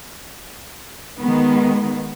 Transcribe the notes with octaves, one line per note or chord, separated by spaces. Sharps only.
D#3 G#3 B3